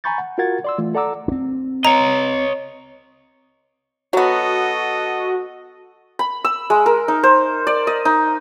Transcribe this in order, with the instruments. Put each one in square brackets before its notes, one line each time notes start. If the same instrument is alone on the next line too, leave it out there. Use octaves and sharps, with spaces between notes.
[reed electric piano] G#5 A#5 B5 C#6 G6 A6
F#5
F4 F#4 A#4 F#5 G#6 A6
D5 C6 E6
E3 A3 F4
A4 D5 F#5 A#5 D6 E6
[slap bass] C4 D4
[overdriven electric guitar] C#5 D#5 [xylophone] A#5
[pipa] F#3 B3 [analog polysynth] F#4 [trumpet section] A4 D#5
[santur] B5
E6
G#3
A#4
D#4
C5
D5
D#5
D#4